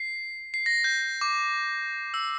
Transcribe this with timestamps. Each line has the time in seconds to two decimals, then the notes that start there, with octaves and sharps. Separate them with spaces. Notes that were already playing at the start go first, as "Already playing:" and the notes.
Already playing: C7
0.54 C7
0.66 A#6
0.84 G6
1.21 D6
2.14 E6